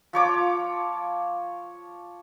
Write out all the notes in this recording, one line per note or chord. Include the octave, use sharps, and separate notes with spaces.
F3 C#5 D6